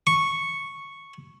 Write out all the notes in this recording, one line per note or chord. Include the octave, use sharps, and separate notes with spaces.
C#6